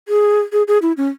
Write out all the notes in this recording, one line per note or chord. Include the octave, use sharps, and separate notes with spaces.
G#4
G#4
G#4
E4
C#4